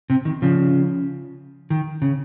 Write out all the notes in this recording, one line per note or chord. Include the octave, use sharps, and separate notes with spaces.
C3
D#3
C#3 F3
D#3
C#3